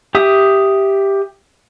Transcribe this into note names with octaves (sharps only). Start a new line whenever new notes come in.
G4 E5 D#6